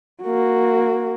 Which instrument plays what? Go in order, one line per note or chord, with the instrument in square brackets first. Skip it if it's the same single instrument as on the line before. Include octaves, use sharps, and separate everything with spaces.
[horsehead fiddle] A#3 F#4